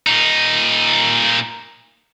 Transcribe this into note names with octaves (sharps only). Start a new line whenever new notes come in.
A#2 D#4